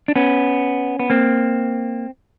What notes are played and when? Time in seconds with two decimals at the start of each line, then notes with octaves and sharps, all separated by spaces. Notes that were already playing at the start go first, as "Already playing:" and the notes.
0.08 D4
0.16 B3 C#4
0.99 B3
1.10 A#3 C4